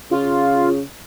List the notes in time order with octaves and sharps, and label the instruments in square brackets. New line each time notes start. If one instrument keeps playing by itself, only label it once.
[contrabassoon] C#3 [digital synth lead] F4